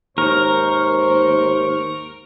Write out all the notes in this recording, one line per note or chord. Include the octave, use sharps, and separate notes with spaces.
D#2 G#2 A#4 C5 C#6